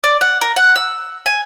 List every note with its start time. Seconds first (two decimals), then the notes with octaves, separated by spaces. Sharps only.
0.04 D5
0.21 F#5
0.41 A#4
0.56 F#5
0.76 E6
1.26 G#5